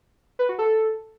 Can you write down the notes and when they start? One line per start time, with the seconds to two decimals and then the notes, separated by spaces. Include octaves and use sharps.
0.39 B4
0.49 F#4
0.59 A4